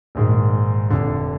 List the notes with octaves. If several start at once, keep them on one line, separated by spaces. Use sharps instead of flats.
A#1 G#2 D#3 G#3
F1 F2 D3